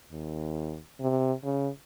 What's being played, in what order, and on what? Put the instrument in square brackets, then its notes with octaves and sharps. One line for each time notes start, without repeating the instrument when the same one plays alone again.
[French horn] D#2
C3
C#3